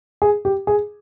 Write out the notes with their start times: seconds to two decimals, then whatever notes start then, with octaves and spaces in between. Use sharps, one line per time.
0.22 G#4
0.45 G4
0.67 G#4